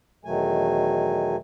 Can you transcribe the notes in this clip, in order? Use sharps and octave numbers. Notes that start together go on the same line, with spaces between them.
E2 B2 D#3 F#3 A3 G#5